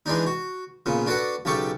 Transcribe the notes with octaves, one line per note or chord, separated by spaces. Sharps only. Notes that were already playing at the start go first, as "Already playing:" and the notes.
E3 G#3 D4 D#4
F#4
A#2 C#3 B3
D4 F#4 A4 B4 F#5
B1 C#3 G4 A4 C#6